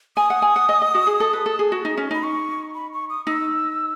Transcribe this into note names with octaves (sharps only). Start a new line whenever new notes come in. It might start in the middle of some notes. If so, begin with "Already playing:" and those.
G#5 D#6
F#5
G#5
F#5
D#5
D#5
F#4
G#4
A4
B4
A4
G#4
F#4
D#4
C#4
D#4 B5
C#6
B5
C#6
D#6
D#4 E6